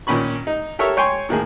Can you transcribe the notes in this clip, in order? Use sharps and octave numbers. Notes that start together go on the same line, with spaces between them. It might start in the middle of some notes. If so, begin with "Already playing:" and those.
A#2 D#3 C#4 B5 C#6
D#4
G4 A4 A#4 C#5 E5
C#5 G5 G#5 C6 C#6
A2 D#3 A#3 G#4